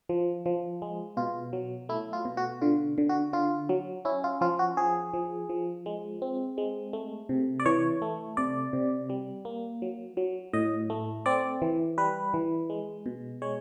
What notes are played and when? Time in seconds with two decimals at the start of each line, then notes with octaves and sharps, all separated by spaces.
0.09 F3
0.46 F3
0.82 G#3
1.17 B2 F4
1.53 F#3
1.89 A3 E4
2.13 F4
2.25 B2
2.37 F#4
2.61 D3 F4
2.98 D3
3.09 F#4
3.33 D3 F4
3.69 F#3
4.05 C#4 E4
4.24 F4
4.41 F3 F4
4.59 F#4
4.77 F3 G#4
5.14 F3
5.49 F3
5.86 G#3
6.22 C4
6.58 G#3
6.93 A3
7.29 C3
7.60 D5
7.66 E3 C#5
8.02 A3
8.37 C3 D5
8.73 C3
9.10 G3
9.45 A#3
9.82 F#3
10.17 F#3
10.53 A2 D#5
10.90 A3
11.26 C4 D5
11.62 E3
11.98 G3 B4
12.34 E3
12.70 G#3
13.06 B2
13.42 G#3 C#5